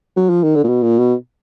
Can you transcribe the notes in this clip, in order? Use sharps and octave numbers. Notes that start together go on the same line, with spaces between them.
F#3
F3
D#3
D3
A#2
B2
A#2
B2